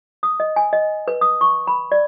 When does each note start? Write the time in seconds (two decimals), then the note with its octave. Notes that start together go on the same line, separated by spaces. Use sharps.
0.23 D#6
0.40 D#5
0.56 G#5
0.73 D#5
1.08 B4
1.21 D#6
1.41 C#6
1.67 B5
1.92 D5